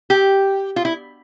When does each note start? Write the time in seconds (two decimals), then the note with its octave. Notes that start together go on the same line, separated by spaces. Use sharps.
0.10 G4
0.76 F4
0.85 E4